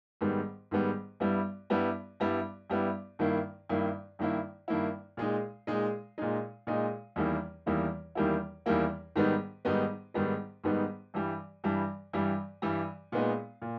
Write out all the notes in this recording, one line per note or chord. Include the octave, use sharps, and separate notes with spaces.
G#2 D#3 G3 B3
G#2 D#3 G3 B3
G2 G3 B3 E4
G2 G3 B3 E4
G2 G3 B3 E4
G2 G3 B3 E4
G2 D#3 A#3 E4
G2 D#3 A#3 E4
G2 D#3 A#3 E4
G2 D#3 A#3 E4
A#2 G#3 D#4
A#2 G#3 D#4
A#2 G#3 D#4
A#2 G#3 D#4
E2 D#3 G3 A#3 E4
E2 D#3 G3 A#3 E4
E2 D#3 G3 A#3 E4
E2 D#3 G3 A#3 E4
G#2 D#3 G3 B3 D#4
G#2 D#3 G3 B3 D#4
G#2 D#3 G3 B3 D#4
G#2 D#3 G3 B3 D#4
G2 E3 G3
G2 E3 G3
G2 E3 G3
G2 E3 G3
A#2 G#3 B3 D#4
A#2